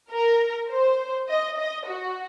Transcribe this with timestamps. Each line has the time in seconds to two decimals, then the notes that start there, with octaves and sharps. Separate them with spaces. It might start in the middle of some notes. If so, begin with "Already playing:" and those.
0.11 A#4
0.70 C5
1.29 D#5
1.58 D#5
1.86 F#4